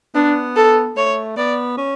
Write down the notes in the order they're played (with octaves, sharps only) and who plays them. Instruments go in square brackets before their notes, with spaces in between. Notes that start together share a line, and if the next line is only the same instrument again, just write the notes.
[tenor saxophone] B3 [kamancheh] D4
[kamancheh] A4
[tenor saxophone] A3 [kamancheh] C#5
[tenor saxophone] B3 [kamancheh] D5
[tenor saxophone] C#4